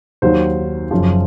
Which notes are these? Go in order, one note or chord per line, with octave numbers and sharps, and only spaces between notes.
D#2 D#3 F#3 C5
F#1 F#2 F3